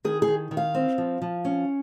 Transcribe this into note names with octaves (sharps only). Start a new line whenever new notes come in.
D#3 G#4
G#4
D#3
D#3
F5
C4
F3
F3
C#4